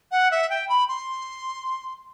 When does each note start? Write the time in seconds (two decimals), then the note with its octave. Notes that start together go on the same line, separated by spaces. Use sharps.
0.12 F#5
0.31 E5
0.50 G5
0.69 B5
0.88 C6